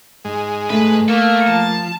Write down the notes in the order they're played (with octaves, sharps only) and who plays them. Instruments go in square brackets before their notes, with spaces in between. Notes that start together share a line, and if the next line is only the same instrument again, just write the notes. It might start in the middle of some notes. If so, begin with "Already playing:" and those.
[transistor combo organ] G#2 G#3
[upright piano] A3 [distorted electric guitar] B4
[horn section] A#3 [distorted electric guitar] A4 E5
[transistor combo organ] F3 [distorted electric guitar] A5